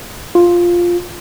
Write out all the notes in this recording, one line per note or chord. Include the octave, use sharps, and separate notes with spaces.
F4